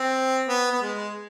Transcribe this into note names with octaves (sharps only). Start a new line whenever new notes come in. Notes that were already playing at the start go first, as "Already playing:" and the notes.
Already playing: C4
B3
B3
G#3